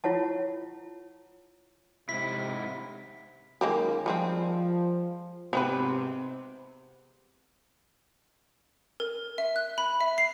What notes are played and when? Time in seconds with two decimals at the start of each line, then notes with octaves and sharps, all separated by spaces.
0.04 E4 F4 C#5 F#5 A5
2.09 G#2 C3 E4 B6
3.61 F#2 D#3 G#3 A#3 G4 A#4
4.06 F3 G3 G#3 C4
5.53 G#2 C3 B3 C4 B4
9.00 A#4
9.38 E5
9.56 F#6
9.78 B5
10.01 E5
10.18 C7